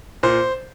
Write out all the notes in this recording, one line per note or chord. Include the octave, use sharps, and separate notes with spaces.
A#2 C5